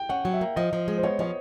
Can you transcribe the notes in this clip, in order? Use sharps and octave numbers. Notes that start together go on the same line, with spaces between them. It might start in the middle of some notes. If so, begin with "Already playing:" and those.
Already playing: G5
C#4 F#5
F#3
E5
A#3
F3 D#5
F3
G#3
C5
B3 C#5
F3 C#5